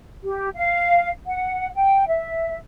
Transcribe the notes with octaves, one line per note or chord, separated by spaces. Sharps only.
G4
F5
F#5
G5
E5